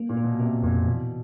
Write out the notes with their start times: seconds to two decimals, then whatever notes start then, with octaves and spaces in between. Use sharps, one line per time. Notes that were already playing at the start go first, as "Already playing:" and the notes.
Already playing: A#3
0.09 A#2
0.17 A#3
0.24 B2
0.39 C3 A#3
0.63 F2 A#2
0.85 B2 E3